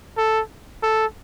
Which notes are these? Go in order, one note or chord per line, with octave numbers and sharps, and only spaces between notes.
A4
A4